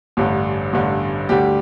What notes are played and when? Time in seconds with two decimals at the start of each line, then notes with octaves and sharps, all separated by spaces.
0.17 A1 G2 D3
0.73 A1 G2 D3
1.29 D2 D3 G3 G4